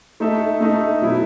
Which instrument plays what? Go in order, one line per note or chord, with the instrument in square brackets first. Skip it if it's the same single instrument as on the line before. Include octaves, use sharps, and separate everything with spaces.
[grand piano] A3 D#4 A4 E5
A3 D#4 A4 E5
B2 F#3 B3 E4